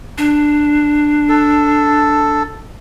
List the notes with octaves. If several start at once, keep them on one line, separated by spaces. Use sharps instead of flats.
D4
A4